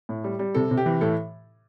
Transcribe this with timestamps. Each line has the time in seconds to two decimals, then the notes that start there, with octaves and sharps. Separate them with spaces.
0.09 A2
0.24 G3
0.39 G3
0.55 C3 A4
0.71 C3
0.77 G4
0.86 E3
1.01 A2 A4